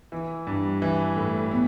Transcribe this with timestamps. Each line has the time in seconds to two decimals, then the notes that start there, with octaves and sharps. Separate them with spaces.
0.12 E3
0.47 G2
0.82 E3
1.16 A2
1.51 B3